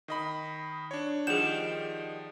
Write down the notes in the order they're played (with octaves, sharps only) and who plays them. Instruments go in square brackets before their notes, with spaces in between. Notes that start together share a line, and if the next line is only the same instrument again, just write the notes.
[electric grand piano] D#3 D#5 B5
D4 C#5
[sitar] D#3 G3 [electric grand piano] F3 F#5 G6 [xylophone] G#4 E7